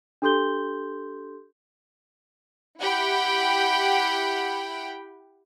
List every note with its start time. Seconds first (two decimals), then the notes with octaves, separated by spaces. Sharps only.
0.22 D4 G4 A4 C6 G6 G7
2.80 E4 G4 F#5 G5 B5